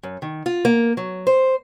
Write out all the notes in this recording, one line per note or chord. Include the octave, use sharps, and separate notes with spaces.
F#2
D#3
F4
A#3
F#3
C5